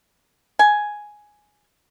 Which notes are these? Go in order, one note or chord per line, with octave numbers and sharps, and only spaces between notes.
G#5